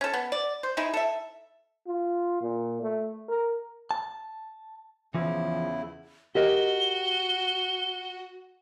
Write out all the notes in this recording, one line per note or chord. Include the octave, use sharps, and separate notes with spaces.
C#4 A4
B3
D5
C5
D#4 E4 G#4
A4 E5
F4
A#2
A3
A#4
A5
E2 C#3 E3 F3 E4
F#4 G4 A#4 D#5 G7